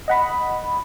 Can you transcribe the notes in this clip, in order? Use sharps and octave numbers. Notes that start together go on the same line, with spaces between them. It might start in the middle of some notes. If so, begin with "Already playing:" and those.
D#5 F#5 B5